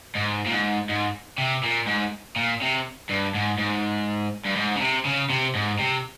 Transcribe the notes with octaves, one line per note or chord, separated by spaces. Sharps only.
G#2
A#2
G#2
G#2
C3
A#2
G#2
A#2
C3
G2
G#2
G#2
G2
G#2
C#3
C3
C#3
C3
G#2
C3